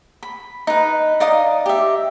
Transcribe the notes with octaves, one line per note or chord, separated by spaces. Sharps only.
B5
D#4 B4
D#4 D5 F5 D#6
G4 E5